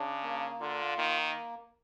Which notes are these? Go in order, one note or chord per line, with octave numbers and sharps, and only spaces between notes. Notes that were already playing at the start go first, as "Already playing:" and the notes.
Already playing: C#3 D4
A#3
D3 F4
D#3 A#3